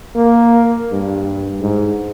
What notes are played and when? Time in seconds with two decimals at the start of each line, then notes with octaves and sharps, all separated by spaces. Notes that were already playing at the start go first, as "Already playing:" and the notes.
0.15 A#3
0.92 G2
1.61 G#2